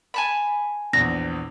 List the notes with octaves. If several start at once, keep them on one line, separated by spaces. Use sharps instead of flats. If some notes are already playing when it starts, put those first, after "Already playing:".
G#5 A5 B5
A#1 E2 A#6